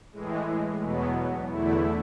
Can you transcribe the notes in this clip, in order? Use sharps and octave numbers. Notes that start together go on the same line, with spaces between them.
A2 E3 G#3
E2 B2 F#3 B3
E2 D3 A3 E4